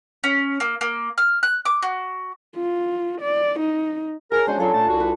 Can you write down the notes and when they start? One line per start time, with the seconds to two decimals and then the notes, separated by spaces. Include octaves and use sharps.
0.24 C#4
0.60 A#3
0.81 A#3
1.18 F6
1.43 F#6
1.65 D6
1.82 F#4
2.56 F4
3.21 D5
3.60 D#4
4.32 G#4 A#4 C#5
4.47 G#3 C#4 D4 F#4 C5
4.59 F#3 F4 A4 C6
4.74 A#2 A3 A5
4.88 C2 F#4
5.00 B4